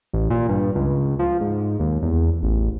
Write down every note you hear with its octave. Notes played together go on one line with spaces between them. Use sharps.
A1
A#2
G2
C#2
F3
G#2
D#2
E2
A1